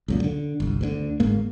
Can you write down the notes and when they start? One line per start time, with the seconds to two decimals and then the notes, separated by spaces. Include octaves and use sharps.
0.08 C#2 F#2 A#2
0.24 D3
0.60 G1 C2
0.81 D2 B2 D3
1.20 G1 G#2 A#3